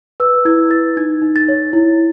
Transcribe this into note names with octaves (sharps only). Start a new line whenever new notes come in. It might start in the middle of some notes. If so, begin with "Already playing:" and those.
B4 E6
E4 G#6
B4 A6
D#4 G#6
D#4
A6
C#5
E4